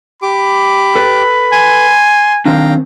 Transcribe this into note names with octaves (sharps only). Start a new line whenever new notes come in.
G4 B5 D6
A4 B4
G#5 C6
D#3 C4 D4 F5 G5 A#5